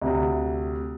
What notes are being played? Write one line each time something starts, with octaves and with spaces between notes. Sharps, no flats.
D2 C3